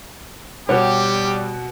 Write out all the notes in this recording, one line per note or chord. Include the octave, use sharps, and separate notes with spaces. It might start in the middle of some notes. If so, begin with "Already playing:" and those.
B2 G3 F#4 G4 C#5